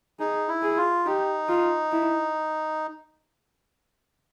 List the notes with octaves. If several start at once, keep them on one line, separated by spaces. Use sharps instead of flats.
D#4 G#4
E4
G#4
F4
D#4 G4
F4
E4